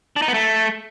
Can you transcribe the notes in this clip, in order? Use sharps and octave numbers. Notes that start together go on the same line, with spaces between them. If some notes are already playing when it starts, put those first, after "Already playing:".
D4
D#4
B3
A3